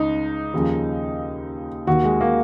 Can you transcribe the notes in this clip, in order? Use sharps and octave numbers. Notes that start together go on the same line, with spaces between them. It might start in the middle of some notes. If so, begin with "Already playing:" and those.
Already playing: C#2 D#4
D#2 C#3 F3
D#2 D#3 F#4
G#3
A#3